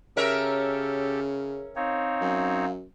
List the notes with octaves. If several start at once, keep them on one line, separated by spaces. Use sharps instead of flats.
C#3 C#4 G4 A4 A#4 E5
C4 D#4 C#5 F5
F#2